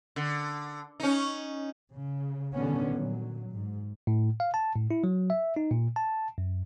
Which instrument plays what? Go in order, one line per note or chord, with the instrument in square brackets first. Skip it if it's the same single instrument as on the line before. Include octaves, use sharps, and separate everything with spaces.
[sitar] D3
C#4 D#4
[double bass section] C#3
B2 D3 D#3 G3 B3 C#4
A#2 F#3
G#2
[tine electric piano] A2
F5
A5
A2
E4
F#3
E5
D#4
A#2
A5
F#2